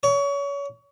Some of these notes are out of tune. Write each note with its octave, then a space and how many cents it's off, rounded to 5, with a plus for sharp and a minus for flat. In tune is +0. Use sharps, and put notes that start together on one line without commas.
C#5 +30